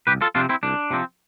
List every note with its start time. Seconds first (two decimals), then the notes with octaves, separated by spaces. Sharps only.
0.07 C2 G4 B4
0.21 F4 A4
0.35 C3 F3 C4 D4 F4
0.49 C4 E4
0.63 C2 D4
0.91 C3 F3 C4